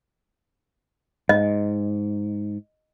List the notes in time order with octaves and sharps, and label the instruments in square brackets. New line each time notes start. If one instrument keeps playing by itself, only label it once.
[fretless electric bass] G#2 [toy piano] D#5